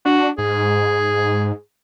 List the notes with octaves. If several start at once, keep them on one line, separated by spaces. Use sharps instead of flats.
D4 F#4
G#2 G#4